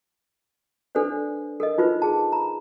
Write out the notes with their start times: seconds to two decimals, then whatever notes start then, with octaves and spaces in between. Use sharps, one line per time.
0.95 D4 A4 B4 C5 D5
1.60 A4 A#4 D#5
1.78 D#4 F4 B4 C5
2.02 G#4 A5
2.32 A#5 B5